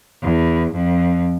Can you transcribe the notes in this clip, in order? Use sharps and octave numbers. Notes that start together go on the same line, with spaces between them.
E2
F2